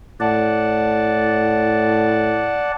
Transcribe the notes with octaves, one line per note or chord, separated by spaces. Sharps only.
A2 D5 F#5 A5